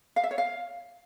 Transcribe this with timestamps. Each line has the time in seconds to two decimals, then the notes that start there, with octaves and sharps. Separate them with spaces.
0.16 F5
0.24 E5
0.31 C#5
0.38 F5